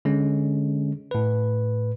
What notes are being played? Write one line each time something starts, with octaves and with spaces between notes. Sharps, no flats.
D3 G#3 C#4
A2 B4